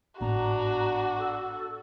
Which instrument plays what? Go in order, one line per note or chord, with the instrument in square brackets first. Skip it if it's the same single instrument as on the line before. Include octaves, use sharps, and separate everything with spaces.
[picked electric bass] G#1 A2 B3 [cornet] D4 [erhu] F#4 [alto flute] A#5
[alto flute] A4